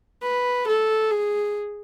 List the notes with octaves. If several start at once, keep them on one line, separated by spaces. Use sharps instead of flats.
B4
A4
G#4